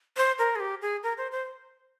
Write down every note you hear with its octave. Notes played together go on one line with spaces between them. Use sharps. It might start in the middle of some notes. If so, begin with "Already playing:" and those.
C5
A#4
G#4
G4
G#4
A#4
C5
C5